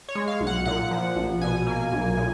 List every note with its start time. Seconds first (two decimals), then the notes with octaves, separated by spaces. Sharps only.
0.09 C#5
0.15 G#3
0.28 F5
0.40 B1
0.47 F#5
0.66 A#2 F#5
0.91 F3
1.16 A#1
1.41 B2 G#5
1.67 A#3
1.92 B1
2.17 A#2